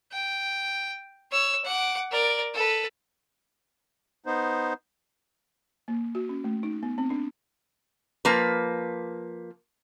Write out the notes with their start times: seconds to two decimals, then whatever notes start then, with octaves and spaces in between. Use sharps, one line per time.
0.12 G5
1.31 C#5 E6
1.64 F#5 D6
2.12 A#4 D5
2.54 A4 B4
4.26 B3 D#4 C5
5.88 A#3
6.15 F#4
6.29 C#4
6.44 A3
6.63 D#4
6.83 B3
6.98 C4
7.10 D4
8.25 F3 A#3 B4